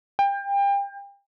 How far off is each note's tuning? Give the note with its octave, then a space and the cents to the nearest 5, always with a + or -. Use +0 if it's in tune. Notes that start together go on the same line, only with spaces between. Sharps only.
G5 +30